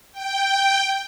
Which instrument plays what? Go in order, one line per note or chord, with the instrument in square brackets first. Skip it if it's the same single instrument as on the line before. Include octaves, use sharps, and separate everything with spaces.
[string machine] G5